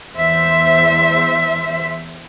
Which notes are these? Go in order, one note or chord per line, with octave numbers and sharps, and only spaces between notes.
E2 C5 E5